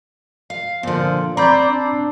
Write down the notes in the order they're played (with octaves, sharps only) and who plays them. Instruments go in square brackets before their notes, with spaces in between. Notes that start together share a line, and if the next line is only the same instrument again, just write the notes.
[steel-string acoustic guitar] F5
[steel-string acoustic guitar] A#2 D3 [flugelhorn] F3
[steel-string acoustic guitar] C4 [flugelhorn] D5 [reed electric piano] A#5 B5 G6
[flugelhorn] D4